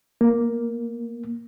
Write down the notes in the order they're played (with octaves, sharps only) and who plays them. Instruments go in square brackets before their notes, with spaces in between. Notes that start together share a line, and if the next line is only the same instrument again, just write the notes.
[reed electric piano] A#3